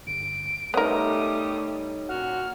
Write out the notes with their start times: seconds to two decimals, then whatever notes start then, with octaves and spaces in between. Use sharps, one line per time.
0.07 G1 D7
0.74 G3 A3 B3 D#4 A#4 C#5 D#6
2.09 A#2 C#4 F#4 F#5 F6